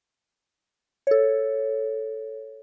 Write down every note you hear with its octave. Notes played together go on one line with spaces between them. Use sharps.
A4 C#5